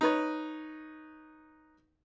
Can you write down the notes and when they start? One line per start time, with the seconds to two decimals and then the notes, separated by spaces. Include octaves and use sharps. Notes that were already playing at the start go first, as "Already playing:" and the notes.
0.01 D#4 B4 C#5